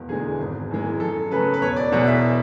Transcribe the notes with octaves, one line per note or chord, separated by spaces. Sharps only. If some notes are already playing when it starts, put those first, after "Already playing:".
Already playing: E1
E2 D3 G#3 G#4
G#1
F#2 E3 G#3
F#2 A4
C#3 F#3 A3 B4
B4
E1 C#5
D5
E2 B2 G#3 F#5
E5